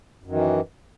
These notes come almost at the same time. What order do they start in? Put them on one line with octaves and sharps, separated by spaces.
F#2 D#3 E3